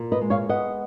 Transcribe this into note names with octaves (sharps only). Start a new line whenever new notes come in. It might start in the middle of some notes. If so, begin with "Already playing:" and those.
Already playing: A#2
B4 D#5
G#3
C#5 F5
B3 D#5 F#5